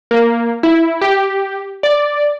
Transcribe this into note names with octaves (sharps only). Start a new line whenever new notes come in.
A#3
E4
G4
D5